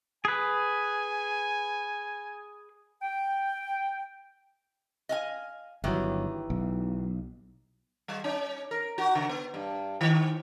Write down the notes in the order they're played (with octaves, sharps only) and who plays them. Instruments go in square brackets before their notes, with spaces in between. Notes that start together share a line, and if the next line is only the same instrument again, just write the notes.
[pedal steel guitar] G#4 B4 [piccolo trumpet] G#5
[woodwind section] G5
[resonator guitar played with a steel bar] D#5 F5 G#5
[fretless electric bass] G1 F#3 [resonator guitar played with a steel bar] D#3 E3 G4
[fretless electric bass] B1
[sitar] G3
C#4
A#4
F#4
C#3
B3
G2
D#3